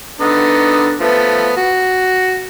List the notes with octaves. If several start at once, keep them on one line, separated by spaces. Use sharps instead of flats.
D3 B3 D#4
F3 A3 B3
F#4